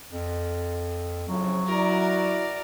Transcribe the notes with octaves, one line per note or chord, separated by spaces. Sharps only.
F2
A2 C#3 F3 F#3
E4 F#4 A#4 D5